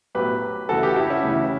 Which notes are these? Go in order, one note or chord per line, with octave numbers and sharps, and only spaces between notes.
B1 A2 F#3 G4 B4
D2 C#3 E3 F#4 A4
G4 B4
F#4
E4 G4
C#4 E4
D2 C#3 E3